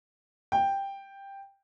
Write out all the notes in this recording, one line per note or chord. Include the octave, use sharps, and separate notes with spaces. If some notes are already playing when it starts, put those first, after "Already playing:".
G5